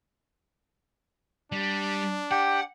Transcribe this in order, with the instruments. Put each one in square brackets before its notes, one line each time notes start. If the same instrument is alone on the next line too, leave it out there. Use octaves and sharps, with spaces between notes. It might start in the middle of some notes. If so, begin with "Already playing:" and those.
[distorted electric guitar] G3 [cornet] D4
[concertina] G4 G5 [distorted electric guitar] F#5